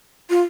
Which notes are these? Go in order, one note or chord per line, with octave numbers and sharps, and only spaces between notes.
F4